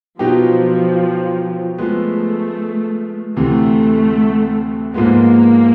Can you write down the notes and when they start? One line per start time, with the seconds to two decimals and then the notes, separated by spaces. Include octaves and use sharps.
0.19 B2 F3 F#3 B3 D#4 G4
1.77 F3 G#3 A3 B3
3.36 D2 C3 E3 A3
4.94 G#2 F3 G#3 A#3 B3